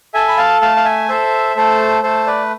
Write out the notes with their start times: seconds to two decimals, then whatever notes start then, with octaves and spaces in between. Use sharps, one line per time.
0.14 A4 E5 G#5
0.28 B5
0.37 F5 A5
0.61 A3 F5 A5
0.76 F5
0.85 E5 G#5
1.08 A4 C5 E5
1.56 A3 A4 C5
2.03 A3 A4 C5
2.27 B4 D5